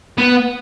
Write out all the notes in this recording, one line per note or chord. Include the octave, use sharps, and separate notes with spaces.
B3